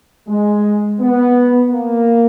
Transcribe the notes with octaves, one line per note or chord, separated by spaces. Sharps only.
G#3
B3
A#3